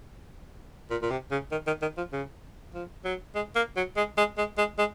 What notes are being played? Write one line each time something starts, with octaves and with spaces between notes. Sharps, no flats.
A#2
A#2
C3
C#3
D#3
D#3
D#3
F3
C#3
F3
F#3
G#3
A#3
F#3
G#3
G#3
G#3
G#3
G#3